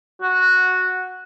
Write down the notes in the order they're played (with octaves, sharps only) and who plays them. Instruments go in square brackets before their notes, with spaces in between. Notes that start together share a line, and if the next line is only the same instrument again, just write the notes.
[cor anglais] F#4